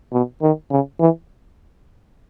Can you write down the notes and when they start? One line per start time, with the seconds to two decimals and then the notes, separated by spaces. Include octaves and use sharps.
0.12 B2
0.42 D#3
0.71 C#3
1.00 E3